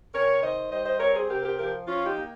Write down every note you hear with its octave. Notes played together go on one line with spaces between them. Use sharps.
C3 A#4 C#5
D#3 C5 D#5
G3 C5 D#5
C5 D#5
C4 A#4 C#5
G#4 C5
C3 G4 A#4
G4 A#4
F3 G4 A#4
F3 C#4 F4
D#4 G4
A#3